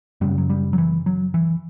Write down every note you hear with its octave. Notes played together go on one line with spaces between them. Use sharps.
F#2 C#3 G3
F#3
G3
F#3
E3
F#3
E3